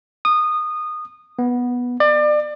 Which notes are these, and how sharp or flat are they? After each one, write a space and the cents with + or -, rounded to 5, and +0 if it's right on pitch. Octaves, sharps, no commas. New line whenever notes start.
D#6 -20
B3 -10
D5 +30